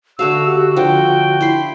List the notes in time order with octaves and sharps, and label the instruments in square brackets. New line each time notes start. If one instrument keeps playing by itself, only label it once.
[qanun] D3 A3 F5 [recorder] F#4 [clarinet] E6
[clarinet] G4
[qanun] D3 F3 [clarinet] G5
[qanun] E4 B5 C6